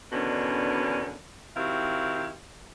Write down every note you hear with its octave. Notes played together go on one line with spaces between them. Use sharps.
E2 B2 D3 D#3 C#4 D4
D#3 C4 E4 F#4 G4 F5